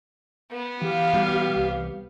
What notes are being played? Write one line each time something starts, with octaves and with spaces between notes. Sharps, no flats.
B3
E3 G4 F5
B2 G3
C2